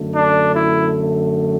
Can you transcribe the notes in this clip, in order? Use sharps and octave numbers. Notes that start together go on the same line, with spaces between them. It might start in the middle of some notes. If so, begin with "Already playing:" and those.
Already playing: F#2 D3 A3
D4
E4